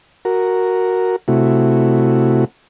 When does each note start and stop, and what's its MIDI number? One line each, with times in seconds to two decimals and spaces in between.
0.25 1.16 66
0.25 1.16 70
1.28 2.45 48
1.28 2.45 57
1.28 2.45 64
1.28 2.45 66